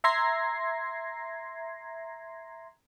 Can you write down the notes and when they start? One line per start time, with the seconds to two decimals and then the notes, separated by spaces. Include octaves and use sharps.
0.04 E5 A#5 C6 G#6 A#6 C7